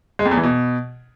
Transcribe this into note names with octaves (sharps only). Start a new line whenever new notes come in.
G#3
F2
E2
E3
B2